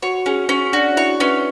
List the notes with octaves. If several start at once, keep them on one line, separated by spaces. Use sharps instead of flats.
F#4 C#5 F#5
C#4 G#4 G#5
C#4
D4 F#4 D5
E4 C#5 E5
C#4 B4